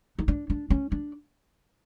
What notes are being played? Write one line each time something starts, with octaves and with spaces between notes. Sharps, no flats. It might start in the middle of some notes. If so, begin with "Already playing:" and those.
D#4
D4
D4
C#4
D4